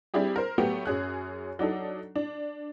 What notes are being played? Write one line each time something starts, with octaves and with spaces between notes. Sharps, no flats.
G3 C4 D4 E4 G4 G#4
A#4 C5
F#3 A3 B3 G4
F#2 C#4 G#4 F#6
F#3 D4 D#4 A4
D4